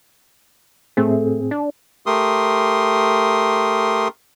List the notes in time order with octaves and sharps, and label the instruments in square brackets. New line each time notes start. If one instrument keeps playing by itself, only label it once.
[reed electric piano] A2 C4 G#4 [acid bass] A3
[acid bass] D4
[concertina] A3 G4 A#4 C6 D#6